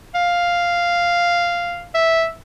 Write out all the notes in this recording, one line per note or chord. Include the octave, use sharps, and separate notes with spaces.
F5
E5